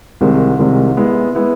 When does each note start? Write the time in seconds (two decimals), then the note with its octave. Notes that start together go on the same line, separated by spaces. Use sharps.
0.21 C2 C3 D#3 G#3
0.59 C2 C3 D#3 G#3
0.97 G#3 B3 E4
1.35 G#3 B3 E4